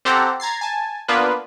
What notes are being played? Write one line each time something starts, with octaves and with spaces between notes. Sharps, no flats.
C4 G4 A4 C5 F#5 A#5
A#5 G#6 A6 C7
G#5 A5
A#3 B3 D4 F4 B4